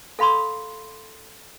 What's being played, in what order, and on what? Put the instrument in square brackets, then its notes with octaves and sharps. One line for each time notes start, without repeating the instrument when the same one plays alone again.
[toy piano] A4 F5 B5 C6 D#6